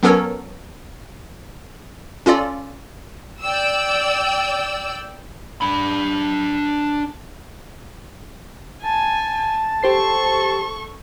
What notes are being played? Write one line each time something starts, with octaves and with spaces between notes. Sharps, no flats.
F#3 B3 C#4 A4 A#4 C#5
C#4 F4 A4 D5
D5 G5 E6
D4 B5
G#5 A5
G4 A4 C5 C#6 C7